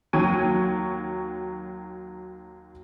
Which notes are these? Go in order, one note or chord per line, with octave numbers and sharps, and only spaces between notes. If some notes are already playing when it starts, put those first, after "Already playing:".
D#2 F#3 G5 C#6 G#6 D#7